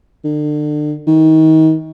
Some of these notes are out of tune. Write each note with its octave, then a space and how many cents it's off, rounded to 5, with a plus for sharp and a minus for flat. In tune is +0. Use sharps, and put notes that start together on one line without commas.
D3 +35
D#3 +30